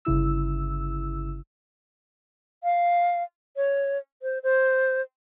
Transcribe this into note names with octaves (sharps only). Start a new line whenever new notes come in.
G1 C#3 E4 E6
F5
C#5
C5
C5